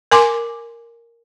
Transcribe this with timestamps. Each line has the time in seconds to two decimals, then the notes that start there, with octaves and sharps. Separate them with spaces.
0.12 A#4 G#5 C6 D6